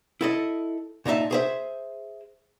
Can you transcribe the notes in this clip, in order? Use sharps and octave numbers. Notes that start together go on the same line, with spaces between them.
E4 A4 D#5
A#2 D#4 E4 E5 A5
G#4 C5 E5